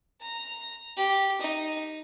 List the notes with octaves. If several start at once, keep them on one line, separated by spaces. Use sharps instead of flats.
A#5
G4
D#4